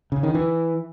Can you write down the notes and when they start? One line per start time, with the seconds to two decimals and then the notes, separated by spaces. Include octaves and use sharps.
0.12 C#3
0.23 D#3
0.35 E3